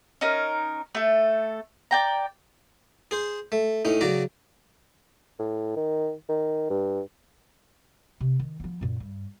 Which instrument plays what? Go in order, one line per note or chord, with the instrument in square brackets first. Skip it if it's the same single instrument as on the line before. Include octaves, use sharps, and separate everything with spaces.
[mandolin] C#4 D#4 A#4
A3 A4
D5 G5 A#5
[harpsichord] G#4 C5
A3
A2 C#4 D#4
C#3 F#3 D5 A#5
[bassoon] A2
D#3
D#3
G2
[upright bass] C3
D#3
F3 B3
F#2 A#2
G2